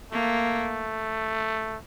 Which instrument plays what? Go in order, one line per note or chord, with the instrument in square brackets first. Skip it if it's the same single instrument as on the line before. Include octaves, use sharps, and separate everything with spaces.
[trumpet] A3 [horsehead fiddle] A#3